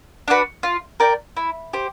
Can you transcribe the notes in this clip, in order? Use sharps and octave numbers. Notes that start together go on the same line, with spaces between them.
D4 F#4 B4
F4
A#4 D5 G5
E4
G4 C5